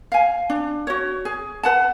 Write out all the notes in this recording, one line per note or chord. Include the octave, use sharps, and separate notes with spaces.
F5 G#5
D4
F#4 C#5
G#4
B4 F#5 A5